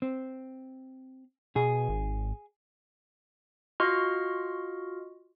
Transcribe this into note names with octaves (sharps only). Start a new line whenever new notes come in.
C4
B2 G#4
G#1
F4 F#4 D#5 C6 C#6 F6